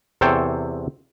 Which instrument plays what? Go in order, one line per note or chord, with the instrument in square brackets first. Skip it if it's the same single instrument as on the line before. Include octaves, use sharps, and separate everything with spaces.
[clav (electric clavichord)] E2 C3 A4 C5 C#5 G5